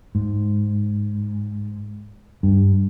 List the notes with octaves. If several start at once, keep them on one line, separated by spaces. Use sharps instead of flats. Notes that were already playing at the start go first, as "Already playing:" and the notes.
G#2
G2